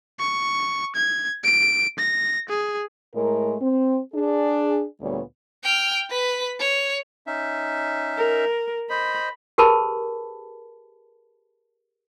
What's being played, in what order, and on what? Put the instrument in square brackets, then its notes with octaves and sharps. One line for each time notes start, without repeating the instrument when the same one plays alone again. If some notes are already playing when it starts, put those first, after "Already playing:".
[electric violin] C#6
G#6
D7
A#6
G#4
[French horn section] A2 G#3 A3 A#4
C4
D4 G#4
D2 A#2 G3 B3 C#5
[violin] G5 F6
B4 B6
C#5
[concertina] C#4 D#4 E5
[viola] A#4
[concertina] C5 D#5 [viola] B5
[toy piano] G4 G#4 A#4 B4 A5 B5